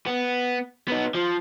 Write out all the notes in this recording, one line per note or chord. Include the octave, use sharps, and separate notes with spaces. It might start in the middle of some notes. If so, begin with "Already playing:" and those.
B3
B3 D#4
F3